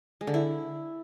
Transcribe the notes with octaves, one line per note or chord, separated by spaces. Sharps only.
G#3
D3
E4